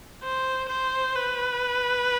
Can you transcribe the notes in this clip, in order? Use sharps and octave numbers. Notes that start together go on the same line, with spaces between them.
C5
C5
B4